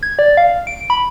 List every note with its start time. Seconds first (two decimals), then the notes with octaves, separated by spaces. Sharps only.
0.03 G#6
0.19 D5
0.37 F5
0.67 D7
0.90 B5